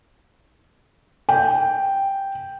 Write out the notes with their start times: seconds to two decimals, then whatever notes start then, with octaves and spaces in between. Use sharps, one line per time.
1.29 G5